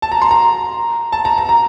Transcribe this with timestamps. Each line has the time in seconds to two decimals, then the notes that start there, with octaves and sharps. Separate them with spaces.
0.02 A5
0.12 A#5
0.22 C6
0.31 A#5
1.12 A5
1.25 A#5
1.38 A#5
1.49 A#5